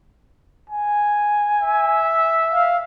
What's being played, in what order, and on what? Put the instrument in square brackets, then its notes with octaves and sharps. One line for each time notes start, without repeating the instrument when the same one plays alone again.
[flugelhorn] G#5
[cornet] E5
[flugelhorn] F5